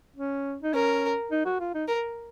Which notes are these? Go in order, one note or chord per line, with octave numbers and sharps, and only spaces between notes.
C#4
D#4
C#4 A#4
D#4
F#4
F4
D#4
A#4